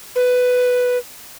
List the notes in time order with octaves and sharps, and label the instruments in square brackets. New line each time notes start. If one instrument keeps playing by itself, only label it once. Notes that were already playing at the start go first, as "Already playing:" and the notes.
[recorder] B4